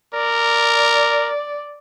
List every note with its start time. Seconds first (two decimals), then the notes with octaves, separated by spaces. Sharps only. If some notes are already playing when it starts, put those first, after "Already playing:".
0.14 A#4 D5